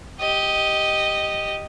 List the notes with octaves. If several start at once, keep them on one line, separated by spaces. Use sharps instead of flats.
G4 D#5